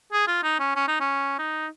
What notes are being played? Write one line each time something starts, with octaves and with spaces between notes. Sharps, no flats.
G#4
F4
D#4
C#4
C#4
D#4
C#4
D#4